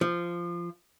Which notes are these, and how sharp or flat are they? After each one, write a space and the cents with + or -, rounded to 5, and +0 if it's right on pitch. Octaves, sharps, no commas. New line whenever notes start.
F3 -15